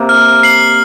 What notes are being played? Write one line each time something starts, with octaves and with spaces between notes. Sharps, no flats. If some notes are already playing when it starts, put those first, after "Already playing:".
Already playing: C3 A#3
F6
C7 F#7